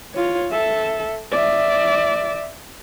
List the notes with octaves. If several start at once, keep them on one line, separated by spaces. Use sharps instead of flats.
F4 C#5
A4 E5
D5 E5